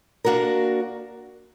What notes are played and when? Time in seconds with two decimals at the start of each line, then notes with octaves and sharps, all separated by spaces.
0.25 A#3 D4 F#4 A#4